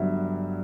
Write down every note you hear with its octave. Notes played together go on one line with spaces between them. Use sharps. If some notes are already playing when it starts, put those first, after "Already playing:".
Already playing: G1 G2 F#3 E5